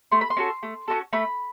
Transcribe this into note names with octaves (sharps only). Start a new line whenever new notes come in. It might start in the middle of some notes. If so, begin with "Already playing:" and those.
A3 C6
B5
C6
C#4 F#4 A4
A3
C#4 F#4 A4
A3 B5